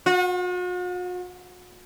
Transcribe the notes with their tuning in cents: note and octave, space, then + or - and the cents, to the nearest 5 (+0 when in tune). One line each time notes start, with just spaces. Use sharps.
F#4 -45